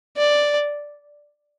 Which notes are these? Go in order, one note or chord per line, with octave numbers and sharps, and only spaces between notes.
D5